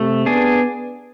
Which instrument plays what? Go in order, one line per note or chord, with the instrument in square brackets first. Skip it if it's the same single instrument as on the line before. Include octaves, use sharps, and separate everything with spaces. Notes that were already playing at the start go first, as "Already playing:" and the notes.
Already playing: [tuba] C3 [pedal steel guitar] A3
[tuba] B3 [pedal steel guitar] D4 G#4